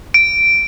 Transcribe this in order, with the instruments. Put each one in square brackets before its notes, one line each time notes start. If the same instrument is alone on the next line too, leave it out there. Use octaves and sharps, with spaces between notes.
[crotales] D7